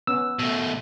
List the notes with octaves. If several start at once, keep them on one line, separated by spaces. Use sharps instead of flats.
B3 C#4 E6
B2 A3